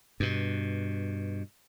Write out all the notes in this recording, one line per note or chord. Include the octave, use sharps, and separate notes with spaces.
G2 B2